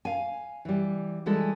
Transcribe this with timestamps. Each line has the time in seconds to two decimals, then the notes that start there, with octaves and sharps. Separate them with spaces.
0.05 F5 G#5
0.65 E3 G3
1.26 E3 G3 G#3 A4